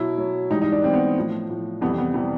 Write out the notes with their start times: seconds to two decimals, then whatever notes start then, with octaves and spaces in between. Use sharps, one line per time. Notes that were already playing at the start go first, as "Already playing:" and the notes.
Already playing: B2 F#3 E4
0.18 B2 F#3
0.50 G#2 E3 G3 D#4
0.62 D#4
0.72 D4
0.83 G#2 E3 G3 C4
0.94 B3
1.16 A2 F3
1.49 A2 F3
1.81 F2 C3 E3 G3 B3
1.98 B3
2.14 C3 E3 G3 B3